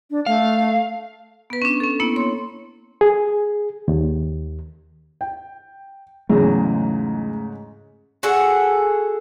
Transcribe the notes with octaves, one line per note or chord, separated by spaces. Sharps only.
D4
A3 F5
B3 B4
C#4 D4
C#4 A4
A#3 B3 C#4 E4
C#5 C6
G#4
D#2
G5
E2 G#2 C#3 F#3 G#3 A3 C#4
F#4 G#4 A4 F#5